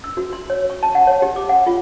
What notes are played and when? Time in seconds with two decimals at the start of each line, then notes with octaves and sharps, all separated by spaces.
0.04 E6
0.17 F#4
0.33 C6
0.50 C#5
0.70 C#6
0.83 A5
0.95 F#5
1.07 C#5
1.22 G4
1.36 D6
1.49 F#5
1.66 F4